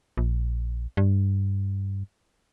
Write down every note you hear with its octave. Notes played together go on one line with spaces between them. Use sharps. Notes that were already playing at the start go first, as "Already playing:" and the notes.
A#1
G2